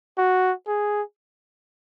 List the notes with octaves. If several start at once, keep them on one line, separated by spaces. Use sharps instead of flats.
F#4
G#4